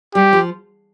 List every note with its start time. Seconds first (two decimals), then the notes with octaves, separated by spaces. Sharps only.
0.15 G3 G4
0.33 F3